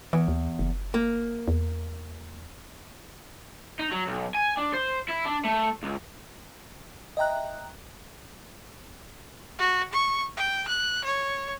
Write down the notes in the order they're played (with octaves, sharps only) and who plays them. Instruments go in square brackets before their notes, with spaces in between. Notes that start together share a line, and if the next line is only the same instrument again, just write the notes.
[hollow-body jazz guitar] E2 [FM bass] E3
[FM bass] D#2
F#1
[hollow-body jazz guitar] A#3
[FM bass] E2
[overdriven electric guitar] D#4
F#3
B1
G#5
D4
C5
E4
D4
A3
C#2
[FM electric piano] D#5 E5 G5 A#5 F#6
[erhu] F#4
C#6
G5
F#6
C#5